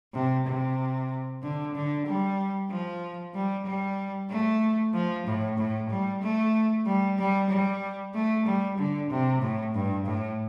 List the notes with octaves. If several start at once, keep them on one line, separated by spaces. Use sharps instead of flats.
C3
C3
D3
D3
G3
F3
G3
G3
A3
F3
A2
A2
G3
A3
G3
G3
G3
A3
G3
D3
C3
A2
G2
A2